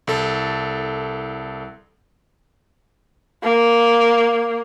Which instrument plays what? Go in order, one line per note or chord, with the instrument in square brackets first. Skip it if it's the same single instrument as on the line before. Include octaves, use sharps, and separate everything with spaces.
[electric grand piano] C2 A4 A6
[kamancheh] A#3